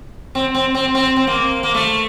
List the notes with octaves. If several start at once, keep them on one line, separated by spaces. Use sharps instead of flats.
C4
C4
C4
C4
C4
A#3
A#3
A3